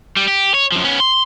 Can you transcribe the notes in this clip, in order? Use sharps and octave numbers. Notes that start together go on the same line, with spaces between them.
G3
G4
C#5
F#2 F3
B3 C#4
C6